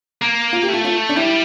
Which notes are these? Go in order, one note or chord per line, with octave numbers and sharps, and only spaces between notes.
A#3
F4
G4
A3
F4
F4
D4
G3 E4